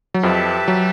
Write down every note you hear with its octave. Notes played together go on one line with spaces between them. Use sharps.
F#3
F2 F3 G4 B4 E5 A5
F#3